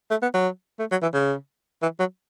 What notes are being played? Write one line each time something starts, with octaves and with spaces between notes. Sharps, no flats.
A3
B3
F#3
A3
F#3
E3
C#3
E3
F#3